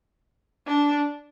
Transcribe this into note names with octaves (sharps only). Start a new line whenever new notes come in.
D4